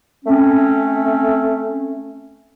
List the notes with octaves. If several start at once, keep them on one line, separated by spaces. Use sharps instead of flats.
A3 C4 C#4